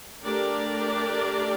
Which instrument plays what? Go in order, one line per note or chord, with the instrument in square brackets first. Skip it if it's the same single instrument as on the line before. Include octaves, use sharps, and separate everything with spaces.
[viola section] A3 D4 G4 A#4 D5